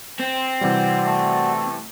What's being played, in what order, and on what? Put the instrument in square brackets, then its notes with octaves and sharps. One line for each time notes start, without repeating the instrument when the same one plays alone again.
[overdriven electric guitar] C4
[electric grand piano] C3 E3 G3 [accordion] F#4 D5
[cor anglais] A3